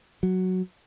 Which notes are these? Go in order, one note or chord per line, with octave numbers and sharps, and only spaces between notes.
F#3